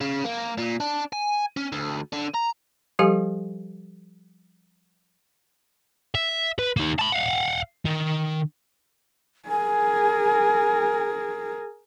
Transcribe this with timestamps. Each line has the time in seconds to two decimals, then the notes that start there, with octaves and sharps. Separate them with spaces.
0.01 C#3
0.24 A#3
0.58 A#2
0.80 D4
1.13 G#5
1.57 C#4
1.73 D2
2.13 D3
2.34 A#5
2.99 F3 G3 G4 A4 F5 G#5
6.15 E5
6.59 B4
6.77 A#3 D#4
6.99 A5 B5
7.12 F5 F#5
7.85 D#3
9.49 G#4 A#4 G#5